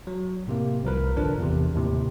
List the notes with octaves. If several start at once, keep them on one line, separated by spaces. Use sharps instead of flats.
F#3
A2 C3 A#3
C2 F3 A#4 B4
G#1 D3 F3 D4 A#4
E2 C3
D#2 A2 C3